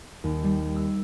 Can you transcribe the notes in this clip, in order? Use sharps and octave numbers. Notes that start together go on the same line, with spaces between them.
D#2
G3
E6